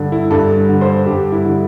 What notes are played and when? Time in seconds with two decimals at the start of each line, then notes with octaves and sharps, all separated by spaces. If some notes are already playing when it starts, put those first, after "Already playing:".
Already playing: G2 D3
0.12 E4
0.30 G2 A4
0.69 D3
0.81 C5
1.06 G2 G4
1.32 E4
1.45 D3